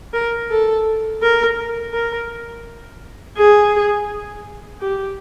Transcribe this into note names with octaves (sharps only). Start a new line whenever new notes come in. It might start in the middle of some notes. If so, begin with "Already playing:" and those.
A#4
A4
A#4
A#4
G#4
G4